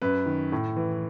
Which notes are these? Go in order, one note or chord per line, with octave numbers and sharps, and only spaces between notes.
F#2 B4
D#3
A2
E3